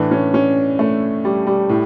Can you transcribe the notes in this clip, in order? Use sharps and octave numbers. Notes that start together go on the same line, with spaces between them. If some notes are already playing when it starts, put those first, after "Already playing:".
Already playing: A2 E3 D4
C#4
C#4
A3
G3
G3
A2